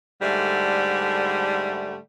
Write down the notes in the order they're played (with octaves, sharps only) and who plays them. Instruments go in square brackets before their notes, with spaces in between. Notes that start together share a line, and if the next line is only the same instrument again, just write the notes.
[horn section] G#2 D3 G3 A3